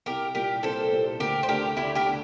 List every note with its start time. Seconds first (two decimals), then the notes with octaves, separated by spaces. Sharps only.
0.06 C2 G4 A#4
0.35 A#2 G3 G4 A#4
0.63 C2 A4 C5
0.92 A#2 G3
1.20 D2 G4 A#4
1.43 C5
1.49 D3 A3 D4 G4 A#4
1.76 D2 E4 G4
1.95 G4 A#4
2.06 D3 A3 D4